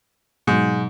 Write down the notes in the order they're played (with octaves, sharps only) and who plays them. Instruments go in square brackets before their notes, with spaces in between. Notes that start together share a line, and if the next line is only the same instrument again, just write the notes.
[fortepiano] G#2 [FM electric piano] B2 F#3